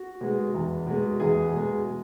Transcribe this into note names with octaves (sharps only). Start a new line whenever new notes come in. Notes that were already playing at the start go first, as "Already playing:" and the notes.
Already playing: F#4
B2 G#3
E2
B2 G#3
E2 G#4
B2 G#3